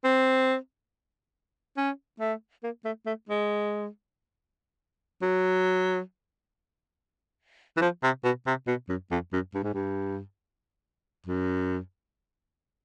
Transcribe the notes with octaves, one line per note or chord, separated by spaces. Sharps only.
C4
C#4
A3
A#3
A3
A3
G#3
F#3
E3
F3
C3
B2
C3
B2
F#2
F2
F#2
G2
G#2
G2
F#2